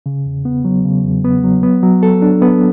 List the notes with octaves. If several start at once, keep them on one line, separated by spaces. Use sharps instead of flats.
C#3
E2
B3
F#3
C#3
E2
B3
F#3
B3
F#3
A4
D4
B3